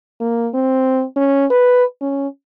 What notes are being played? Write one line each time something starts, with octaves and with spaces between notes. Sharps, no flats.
A#3
C4
C#4
B4
C#4